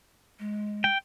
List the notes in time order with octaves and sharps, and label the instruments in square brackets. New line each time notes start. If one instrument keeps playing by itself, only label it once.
[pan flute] G#3
[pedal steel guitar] G5